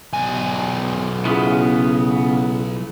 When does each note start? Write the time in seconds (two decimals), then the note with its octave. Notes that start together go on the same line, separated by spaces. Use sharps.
0.13 B1 G#5
1.25 C#3 B3 E4 F4 G#4